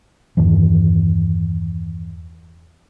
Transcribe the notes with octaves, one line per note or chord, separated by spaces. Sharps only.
E2 G2 D#3 E3